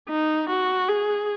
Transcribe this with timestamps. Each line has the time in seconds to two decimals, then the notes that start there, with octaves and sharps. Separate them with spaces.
0.09 D#4
0.49 F#4
0.88 G#4